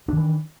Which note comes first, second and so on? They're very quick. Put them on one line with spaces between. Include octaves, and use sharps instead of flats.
D4 D#3 E3